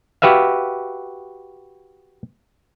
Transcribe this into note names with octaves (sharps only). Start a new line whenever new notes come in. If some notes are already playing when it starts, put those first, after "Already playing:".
F#4 G4 B4 E5 F5